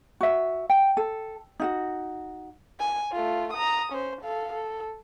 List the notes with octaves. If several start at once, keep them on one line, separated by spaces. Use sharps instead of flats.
F#4 E5
G5
A4
D#4 F4 F#4
G#5
A3 F4
A#5 D#6
C#4 C5
A4 F5
A4